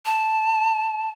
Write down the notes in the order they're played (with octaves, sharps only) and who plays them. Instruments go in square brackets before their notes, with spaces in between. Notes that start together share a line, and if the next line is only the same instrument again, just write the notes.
[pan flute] A5